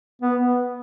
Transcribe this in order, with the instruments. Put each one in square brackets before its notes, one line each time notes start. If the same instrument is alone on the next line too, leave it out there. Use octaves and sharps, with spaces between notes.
[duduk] B3